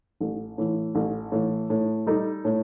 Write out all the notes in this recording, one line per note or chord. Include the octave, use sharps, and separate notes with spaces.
A1
A2 E3
A1
A2 E3
A2
G3 D#4 A4
A2